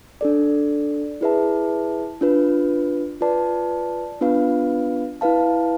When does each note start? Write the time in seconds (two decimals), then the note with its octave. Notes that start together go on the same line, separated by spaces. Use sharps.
0.21 D4 A4 D5
1.21 E4 G#4 B4 E5 A5
2.21 D4 F4 B4
3.21 F4 B4 D5 A5
4.21 B3 D4 F4 B4 F5
5.21 E4 B4 F5 A5